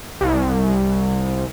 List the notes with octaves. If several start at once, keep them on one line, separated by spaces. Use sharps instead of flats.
C2